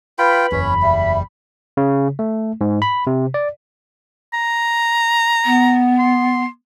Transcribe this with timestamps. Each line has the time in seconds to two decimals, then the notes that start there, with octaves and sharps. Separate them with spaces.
0.19 F4 B4 G5 B5
0.52 F#1 E2 C#4
0.82 G3 E5
1.77 C#3
2.19 A3
2.61 G#2
2.82 B5
3.07 C3
3.34 D5
4.33 A#5
5.45 B3
5.98 C6